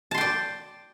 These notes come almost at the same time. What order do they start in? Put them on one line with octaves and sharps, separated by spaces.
A5 C6 G5 D5